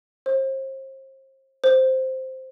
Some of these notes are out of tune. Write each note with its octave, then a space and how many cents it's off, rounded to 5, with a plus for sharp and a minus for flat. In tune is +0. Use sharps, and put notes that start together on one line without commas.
C5 +35
C5 +0